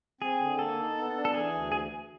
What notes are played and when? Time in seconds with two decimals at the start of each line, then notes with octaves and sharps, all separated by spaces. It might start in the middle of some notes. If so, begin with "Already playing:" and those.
0.21 C4 G#4
0.40 D3
0.59 A#3 A4
0.79 D#4
0.97 B3
1.16 D4
1.25 A4
1.34 E3 G#4
1.53 D2
1.72 G#4